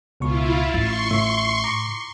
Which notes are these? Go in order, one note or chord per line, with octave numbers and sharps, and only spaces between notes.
C#2 B2 E4 F4 C#6
A1 C6 C#6 A6
A2 E5
A#5 D6